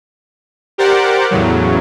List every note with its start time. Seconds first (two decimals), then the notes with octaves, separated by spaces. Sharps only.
0.78 G4 A#4 C5 D5 F#5
1.31 E2 A2 C#3 F#3